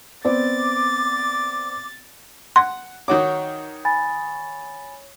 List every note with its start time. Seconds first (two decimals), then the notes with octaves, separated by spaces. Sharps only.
0.25 B3 C4 D5 D6 A6
2.56 F#5 C6
3.08 D#3 F#4 C#5 D6 D#6
3.85 G#5 B5 A6